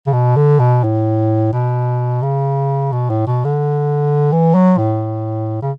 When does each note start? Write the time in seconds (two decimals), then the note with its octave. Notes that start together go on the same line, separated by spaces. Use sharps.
0.07 C#3
0.13 B2
0.36 D3
0.59 B2
0.83 A2
1.53 B2
2.22 C#3
2.92 B2
3.10 A2
3.27 B2
3.44 D3
4.32 E3
4.55 F#3
4.78 A2
5.62 C#3